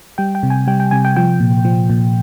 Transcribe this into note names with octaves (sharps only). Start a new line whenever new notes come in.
G3 G5
G5
C3
G#5
G3 G5
G5
C3 G#5
G5
F3 G5
A#2
F3
A#2